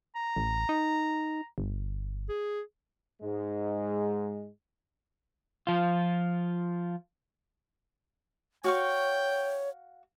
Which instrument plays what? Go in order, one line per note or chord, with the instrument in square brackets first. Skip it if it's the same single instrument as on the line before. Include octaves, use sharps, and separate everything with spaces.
[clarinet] A#5
[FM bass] A1
D#4
G1
[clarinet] G#4
[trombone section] G#2 G#3
[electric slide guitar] F3 F4
[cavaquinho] F#4 F5 C#6 [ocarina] C#5 [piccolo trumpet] G5